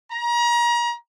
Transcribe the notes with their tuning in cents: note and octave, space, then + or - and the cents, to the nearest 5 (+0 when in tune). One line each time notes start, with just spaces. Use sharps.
A#5 +35